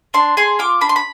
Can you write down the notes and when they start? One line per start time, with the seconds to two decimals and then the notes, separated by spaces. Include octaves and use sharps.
0.14 D4 C6
0.37 G#4 C6
0.59 F4 D6
0.81 D4 B5
0.89 C6
0.96 B5